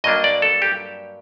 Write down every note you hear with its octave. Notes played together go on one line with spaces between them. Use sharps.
G2 F#3 A#3 D4 D#5
D5
A4
G4